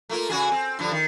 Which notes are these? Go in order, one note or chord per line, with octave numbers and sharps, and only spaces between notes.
A3 A#3 F4
C#3 F#4 G#4
C4
G2 D3 F3
D#3